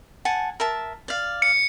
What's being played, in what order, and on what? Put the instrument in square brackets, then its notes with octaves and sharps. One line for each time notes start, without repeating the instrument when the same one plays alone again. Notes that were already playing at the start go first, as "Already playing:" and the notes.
[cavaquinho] F#5 G#5 A5
A#4 E5 A5
D5 F5
[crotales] C#7